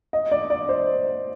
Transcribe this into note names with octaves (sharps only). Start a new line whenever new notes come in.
D#5
D5
D5
C5